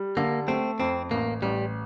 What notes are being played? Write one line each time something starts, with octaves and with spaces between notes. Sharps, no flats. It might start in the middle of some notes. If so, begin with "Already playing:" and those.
Already playing: G3
D3 A#3
A3 C4
F2 C4
A1 A#3
A1 G3